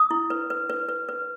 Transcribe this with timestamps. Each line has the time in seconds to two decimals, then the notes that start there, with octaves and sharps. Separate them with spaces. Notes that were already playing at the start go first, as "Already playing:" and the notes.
Already playing: D#6
0.11 E4
0.30 B4
0.50 B4
0.70 B4
0.89 B4
1.09 B4